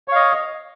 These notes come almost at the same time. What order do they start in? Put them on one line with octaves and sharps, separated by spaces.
C#5 F5 D#5